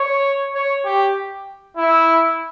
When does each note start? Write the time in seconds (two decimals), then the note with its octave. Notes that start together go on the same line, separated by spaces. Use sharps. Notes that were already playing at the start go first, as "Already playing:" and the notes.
Already playing: C#5
0.55 C#5
0.85 G4
1.77 E4